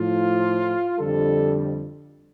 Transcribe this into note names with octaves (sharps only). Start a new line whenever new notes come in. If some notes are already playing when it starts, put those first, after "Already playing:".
Already playing: A2 F3 F4
F2 D3 G3 A4